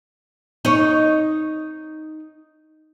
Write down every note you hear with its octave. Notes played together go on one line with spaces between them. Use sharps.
D#4 C#5